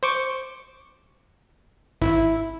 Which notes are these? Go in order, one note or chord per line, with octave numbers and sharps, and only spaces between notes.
C5 C#6 D6
G#1 E4